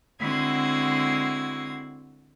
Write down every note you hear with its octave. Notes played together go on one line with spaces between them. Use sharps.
D3 G#3 C4 E4 F#4 G#6